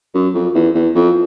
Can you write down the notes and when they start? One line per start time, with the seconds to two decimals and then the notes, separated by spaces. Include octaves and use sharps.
0.14 F#2
0.35 F2
0.55 E2
0.75 E2
0.95 F2